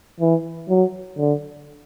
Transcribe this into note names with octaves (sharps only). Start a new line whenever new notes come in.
E3
F#3
D3